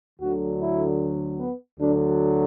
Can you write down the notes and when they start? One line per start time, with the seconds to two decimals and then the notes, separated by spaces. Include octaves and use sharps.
0.20 D2 D3 F#3 F#4
0.59 E4
1.39 B3
1.79 D2 D3 F#3 D4